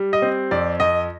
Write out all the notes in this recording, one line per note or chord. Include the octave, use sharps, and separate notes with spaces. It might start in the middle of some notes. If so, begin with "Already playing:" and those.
Already playing: G3
D#5
C4
F2 D5
F2 D#5